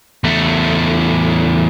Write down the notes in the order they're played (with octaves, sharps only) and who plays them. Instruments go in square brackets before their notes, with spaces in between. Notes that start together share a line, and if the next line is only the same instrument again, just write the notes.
[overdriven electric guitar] E2 A3